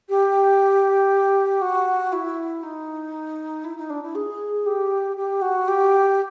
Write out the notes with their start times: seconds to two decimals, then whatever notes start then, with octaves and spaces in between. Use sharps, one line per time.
0.09 G4
1.61 F#4
2.12 E4
2.63 D#4
3.64 E4
3.76 D#4
3.89 D4
4.02 E4
4.15 G#4
4.66 G4
5.16 G4
5.41 F#4
5.67 G4